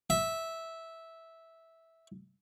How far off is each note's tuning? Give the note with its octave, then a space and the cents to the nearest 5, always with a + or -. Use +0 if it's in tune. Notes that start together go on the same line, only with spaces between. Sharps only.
E5 -10